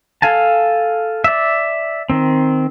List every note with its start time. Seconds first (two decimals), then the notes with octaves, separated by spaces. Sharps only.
0.22 A4 F5 G#5 A5
1.24 D5 E5
2.10 D#3 C4